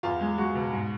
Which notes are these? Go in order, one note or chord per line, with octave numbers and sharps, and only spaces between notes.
E2 F4
G#3
G#3 F#4
B2
G#2